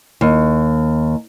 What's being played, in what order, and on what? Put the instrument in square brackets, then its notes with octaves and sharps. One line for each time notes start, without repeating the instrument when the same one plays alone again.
[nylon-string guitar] D#2